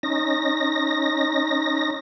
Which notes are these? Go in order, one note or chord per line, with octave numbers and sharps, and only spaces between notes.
C#4 D#4 A#6